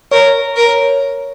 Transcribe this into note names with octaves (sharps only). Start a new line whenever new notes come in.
A#4 C#5
A#4